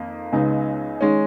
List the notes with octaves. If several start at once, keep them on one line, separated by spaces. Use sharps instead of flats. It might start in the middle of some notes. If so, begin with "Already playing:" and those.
Already playing: F2 D#3 A#3 D#4
C#2 C#3 G#3 B3 D#4
D#3 G#3 C#4